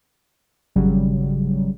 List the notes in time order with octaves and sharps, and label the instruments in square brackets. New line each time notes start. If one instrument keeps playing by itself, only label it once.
[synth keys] G#1 C#3 F#3 G3